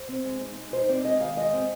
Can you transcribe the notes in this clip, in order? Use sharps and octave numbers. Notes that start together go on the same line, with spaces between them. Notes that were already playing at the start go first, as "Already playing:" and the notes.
Already playing: C5
C4
G#3
D#4
G#3
D#4 C5
C4 D5
G#3 D#5
D#3 F5
G#3 D#5
C4